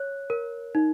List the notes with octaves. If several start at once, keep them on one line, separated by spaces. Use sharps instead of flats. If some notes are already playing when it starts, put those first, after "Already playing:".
Already playing: C#5 F#6
A#4
D#4